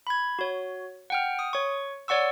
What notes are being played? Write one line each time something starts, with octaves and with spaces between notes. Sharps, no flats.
B5 G#6
F#4 C#5
F#5 G5 F6
D#6
C#5 C#6
C#5 D5 F#5 C#6 E6